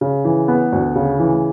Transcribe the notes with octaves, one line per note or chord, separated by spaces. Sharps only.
C#3
E3
B3
D2
C#3
E3